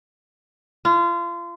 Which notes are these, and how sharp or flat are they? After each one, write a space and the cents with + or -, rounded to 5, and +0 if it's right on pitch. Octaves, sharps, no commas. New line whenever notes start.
F4 -30